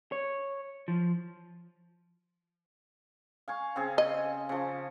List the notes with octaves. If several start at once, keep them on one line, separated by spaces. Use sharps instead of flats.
C#5
F3
F5 G#5 C#6
C#3 C4 G#4
D#5
C#3 F3